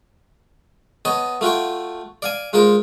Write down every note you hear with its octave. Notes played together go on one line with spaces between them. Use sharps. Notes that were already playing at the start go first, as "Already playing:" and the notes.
B3 C#5 D#5 A5
A3 F4 F#4 G5
D5 F5 G#5
G#3 F4 A#4 C5